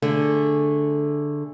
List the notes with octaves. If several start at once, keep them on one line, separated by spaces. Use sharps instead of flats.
D3 A3 G#4